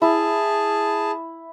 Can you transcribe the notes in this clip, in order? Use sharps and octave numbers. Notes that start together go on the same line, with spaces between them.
E4 G#4 A5